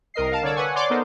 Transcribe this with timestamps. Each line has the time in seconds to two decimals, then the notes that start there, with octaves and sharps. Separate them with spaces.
0.14 C2 A#4 D#5 C7
0.30 A#4 F5 A5
0.42 D3 C#5 D5 E6
0.55 B4 F#5 G#5 C#6
0.75 C#5 D5 C6 D6
0.90 B3 D#4 A4 A#4 C5